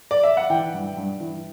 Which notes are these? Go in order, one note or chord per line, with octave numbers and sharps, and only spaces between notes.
D5
E5
F#5
E3 G5
G2
G2
E3